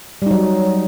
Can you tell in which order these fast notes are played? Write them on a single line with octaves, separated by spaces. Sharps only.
G3 D#4 F#3